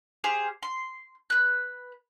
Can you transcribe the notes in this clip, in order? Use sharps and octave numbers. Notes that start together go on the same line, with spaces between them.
G4 G#4 C5 F5
C6
B4 F#6